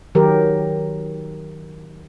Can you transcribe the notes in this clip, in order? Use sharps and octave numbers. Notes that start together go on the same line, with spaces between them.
D#3 F#3 G4 A#4